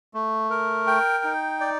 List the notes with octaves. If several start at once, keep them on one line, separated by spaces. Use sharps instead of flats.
A3
A#4
G5
D#4
D5